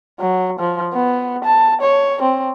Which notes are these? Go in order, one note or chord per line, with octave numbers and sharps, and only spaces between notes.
F#3
F3
B3
A5
C#5
C4